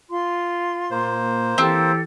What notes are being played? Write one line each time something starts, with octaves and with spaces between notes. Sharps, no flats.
F4 C6
A#2 A#3 C5
E3 C4 G4 A4